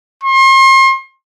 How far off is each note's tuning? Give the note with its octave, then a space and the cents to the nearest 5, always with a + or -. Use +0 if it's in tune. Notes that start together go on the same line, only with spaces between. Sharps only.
C6 +40